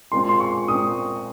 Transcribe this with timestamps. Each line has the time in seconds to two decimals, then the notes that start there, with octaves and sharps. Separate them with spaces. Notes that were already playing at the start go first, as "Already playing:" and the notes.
0.12 A#2 G#3 C4 F4 C6
0.29 C6
0.40 C#6
0.68 A#2 G#3 C4 F4 D#6